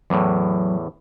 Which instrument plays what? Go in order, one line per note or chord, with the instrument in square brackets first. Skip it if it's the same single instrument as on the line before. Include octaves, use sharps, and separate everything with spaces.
[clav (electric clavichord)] E2 A2 [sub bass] F#3